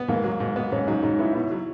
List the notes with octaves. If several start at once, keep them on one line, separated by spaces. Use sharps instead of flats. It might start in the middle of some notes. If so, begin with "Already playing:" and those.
Already playing: B3
G#2 A#3
F#3
G#2
B3
G#2 C#4
F#3 D#4
G#2 D#4
B3 E4
B2 E4
F#3